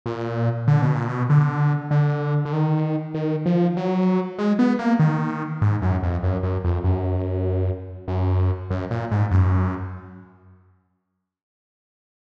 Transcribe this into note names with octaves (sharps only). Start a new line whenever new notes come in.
A#2
D3
B2
A#2
B2
D3
D3
D3
D#3
D#3
F3
F#3
G#3
B3
A#3
D#3
G#2
F#2
F2
F#2
F#2
F2
F#2
F#2
F#2
A#2
G#2
F#2